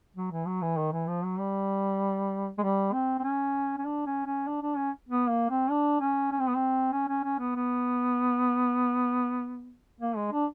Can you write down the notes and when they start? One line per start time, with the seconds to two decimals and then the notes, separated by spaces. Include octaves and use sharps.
0.16 F#3
0.31 E3
0.47 F#3
0.62 E3
0.77 D#3
0.92 E3
1.08 F3
1.24 F#3
1.39 G3
2.58 G#3
2.62 G3
2.93 C4
3.19 C4
3.23 C#4
3.78 C#4
3.85 D4
4.06 C#4
4.26 C#4
4.47 D4
4.61 D4
4.77 C#4
5.09 B3
5.29 A#3
5.50 C4
5.70 D4
6.00 C#4
6.32 C#4
6.40 C4
6.48 B3
6.55 C4
6.92 C#4
7.08 C#4
7.24 C#4
7.39 B3
7.55 B3
10.00 A#3
10.16 G#3
10.32 D4